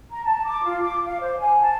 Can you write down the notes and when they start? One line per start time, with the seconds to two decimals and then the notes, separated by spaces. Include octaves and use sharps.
0.10 A#5
0.23 A5
0.45 D6
0.64 F4
0.82 D6
1.05 F5
1.20 C5
1.37 G#5
1.60 A5